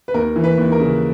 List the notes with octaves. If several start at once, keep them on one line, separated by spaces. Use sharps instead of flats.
B4
D#2 A#4
E3
B4
D#2
A#4
C#3